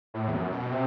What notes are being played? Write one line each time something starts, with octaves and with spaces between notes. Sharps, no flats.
A2
E2
F#2
B2
C3